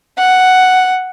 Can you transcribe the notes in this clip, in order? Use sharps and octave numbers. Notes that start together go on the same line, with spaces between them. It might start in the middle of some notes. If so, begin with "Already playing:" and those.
F#5